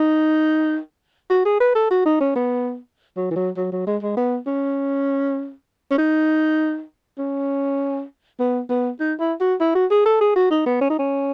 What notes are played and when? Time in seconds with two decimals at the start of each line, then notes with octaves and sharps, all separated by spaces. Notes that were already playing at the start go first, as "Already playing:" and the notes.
Already playing: D#4
1.30 F#4
1.45 G#4
1.60 B4
1.75 A4
1.91 F#4
2.06 D#4
2.21 C#4
2.36 B3
3.17 F#3
3.31 E3
3.36 F#3
3.57 F#3
3.72 F#3
3.87 G#3
4.02 G#3
4.17 B3
4.47 C#4
5.91 C#4
5.98 D#4
7.19 C#4
8.40 B3
8.69 B3
9.00 D#4
9.20 E4
9.40 F#4
9.61 E4
9.75 F#4
9.91 G#4
10.06 A4
10.21 G#4
10.36 F#4
10.51 D#4
10.66 B3
10.81 C#4
10.90 D#4
10.99 C#4